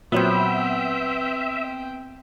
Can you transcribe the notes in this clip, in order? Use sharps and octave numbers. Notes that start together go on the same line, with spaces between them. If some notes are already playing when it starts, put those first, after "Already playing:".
A#2 F#3 B3 C4 C5 E5 G5